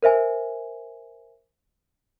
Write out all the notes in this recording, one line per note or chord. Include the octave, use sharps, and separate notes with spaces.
A#4 C5 E5 G#5